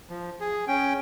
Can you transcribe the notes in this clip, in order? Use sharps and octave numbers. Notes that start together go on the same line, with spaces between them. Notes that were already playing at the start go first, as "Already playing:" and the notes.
F3
G#4
C#4 G5